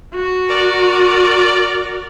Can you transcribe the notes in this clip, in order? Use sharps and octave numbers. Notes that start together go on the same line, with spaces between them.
F#4
A#4 D5